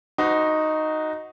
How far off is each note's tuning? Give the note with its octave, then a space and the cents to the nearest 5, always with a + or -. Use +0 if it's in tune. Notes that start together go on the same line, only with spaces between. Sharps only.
D#4 +0 F#4 +0 C5 -35